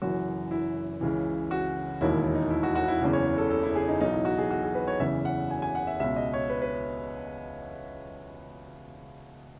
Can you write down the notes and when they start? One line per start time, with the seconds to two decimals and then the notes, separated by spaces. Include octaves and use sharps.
0.02 F#1 F#2 E3 F#4
0.51 E4
1.01 C#2 C#3 E3
1.51 F#4
2.01 E1 D#2 D#3 E4
2.34 D#4
2.50 E4
2.63 F#4
2.75 F#4
2.88 E4
3.01 F#1 E2 C#3 E3
3.13 C#5
3.38 A4
3.50 A4
3.63 E4
3.75 G#4
3.88 D#4
4.00 B1 B2 D#4
4.12 E4
4.25 F#4
4.38 G#4
4.51 F#4
4.63 G#4
4.75 B4
4.87 C#5
5.00 F#1 E2 C#3 E3 E5
5.25 F#5
5.50 G#5
5.62 G#5
5.75 F#5
5.87 E5
6.00 C#2 B2 E5
6.16 D#5
6.34 C#5
6.50 B4
6.62 B4